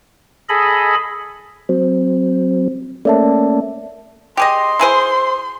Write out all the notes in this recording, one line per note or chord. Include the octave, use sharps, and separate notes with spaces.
G#4 A4 D#5 B5
F#3 C4
A3 A#3 C#4 D5 E5 A5
G4 G#4 D#5 C6
E4 G#4 C5